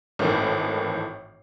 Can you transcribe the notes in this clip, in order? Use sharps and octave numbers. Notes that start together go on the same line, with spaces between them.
G#1 A2 D#3 E3